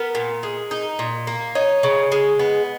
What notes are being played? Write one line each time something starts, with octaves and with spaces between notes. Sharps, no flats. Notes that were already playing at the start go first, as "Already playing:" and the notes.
Already playing: B3 A#4
A#2
G#3
D#4
A#2
A#3
D#4 C#5
C#3
G#3
B3